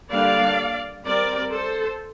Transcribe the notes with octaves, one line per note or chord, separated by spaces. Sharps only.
D3 G3 A#3 D4 D5 F5
G3 C4 A#4 D5
A4 C5